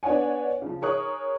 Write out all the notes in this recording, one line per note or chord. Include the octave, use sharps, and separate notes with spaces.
B3 D4 C#5 D5 F#5 G#5
C#3 F3
G#4 A#4 C#5 C#6 D#6 F#6